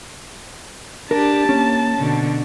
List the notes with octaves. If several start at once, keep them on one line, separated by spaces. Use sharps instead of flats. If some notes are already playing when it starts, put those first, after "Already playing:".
D4 G4 A#4 D5 A5
A#3 C#4
B2 D3